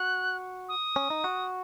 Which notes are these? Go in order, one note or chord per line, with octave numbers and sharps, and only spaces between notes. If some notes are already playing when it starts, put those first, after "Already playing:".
Already playing: F#4 F#6
D#6
C#4
D#4
F#4